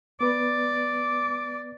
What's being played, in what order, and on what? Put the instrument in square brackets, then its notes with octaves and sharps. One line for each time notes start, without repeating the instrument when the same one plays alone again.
[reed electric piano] B3 B4 [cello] D5 [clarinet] D6